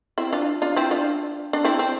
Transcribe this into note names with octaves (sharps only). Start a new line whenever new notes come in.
C4 E4
D4 F4
D4 F4
C4 E4
D4 F4
D4
C4 E4
C4